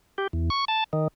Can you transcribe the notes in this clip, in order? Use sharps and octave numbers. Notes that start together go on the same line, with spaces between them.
G4
E2
C#6
A5
D#3